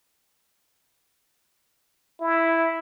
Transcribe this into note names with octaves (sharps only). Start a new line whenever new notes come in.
E4